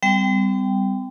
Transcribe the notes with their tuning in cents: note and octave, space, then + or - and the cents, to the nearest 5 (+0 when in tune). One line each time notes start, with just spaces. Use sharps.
G3 +0 C4 -40 G5 +0